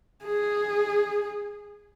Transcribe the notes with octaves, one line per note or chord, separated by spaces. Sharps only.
G#4